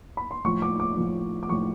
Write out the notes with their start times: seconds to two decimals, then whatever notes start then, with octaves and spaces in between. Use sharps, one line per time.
0.17 B5
0.31 C6
0.44 A2 F3 C#6
0.62 D6
0.80 D6
0.97 A2 F3
1.43 D6
1.49 A2 F3 C#6